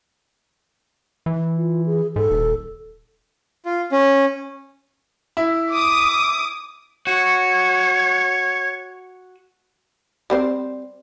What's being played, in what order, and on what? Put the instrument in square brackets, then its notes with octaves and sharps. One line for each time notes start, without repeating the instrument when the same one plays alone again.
[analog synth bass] E3
[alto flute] F4
G#4
[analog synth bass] G#2 [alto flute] A4
[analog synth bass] D#1
[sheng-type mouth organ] F4
C#4
[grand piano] E4
[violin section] D6 D#6
[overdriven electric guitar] F#4 [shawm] C#5
[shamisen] G3 C4 C5